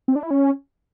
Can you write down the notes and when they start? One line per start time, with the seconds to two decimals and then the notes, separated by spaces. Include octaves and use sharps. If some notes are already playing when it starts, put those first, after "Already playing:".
0.08 C4
0.16 D4
0.23 E4
0.31 C#4